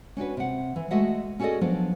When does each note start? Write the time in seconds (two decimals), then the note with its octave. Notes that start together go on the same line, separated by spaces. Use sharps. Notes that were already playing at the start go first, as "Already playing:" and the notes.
0.17 C#4 D4 F#4 B4
0.37 C3 F#5
0.76 E3
0.91 G#3 A3 F#4 D#5 E5 F#5
1.39 C#4 F#4 G#4 A4 D5 D#5
1.61 F3 F#3 B3 D4